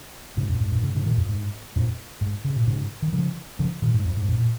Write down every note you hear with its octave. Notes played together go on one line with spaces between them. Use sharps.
G#2 C#3
F2 A#2
G#2
F2 A#2
G#2 C#3
G#2 C#3
A#2 D#3
F2
G#2
F2 A#2
G#2
C#3
A#2
G#2 C#3
D#3
C#3 F3
C#3 F3
A#2 D#3
G#2
F2
G#2
F2 A#2
A#2